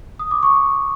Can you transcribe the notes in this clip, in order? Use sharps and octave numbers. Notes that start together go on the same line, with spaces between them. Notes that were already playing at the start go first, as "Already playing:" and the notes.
D#6
D6
C#6